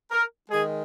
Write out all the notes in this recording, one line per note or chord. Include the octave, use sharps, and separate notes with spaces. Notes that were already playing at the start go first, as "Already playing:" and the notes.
A#4
D#3 G#3 G#4